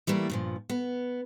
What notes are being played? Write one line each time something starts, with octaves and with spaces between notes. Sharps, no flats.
E3 G3 A3 A#3 E4
G2 A#2 F3
B3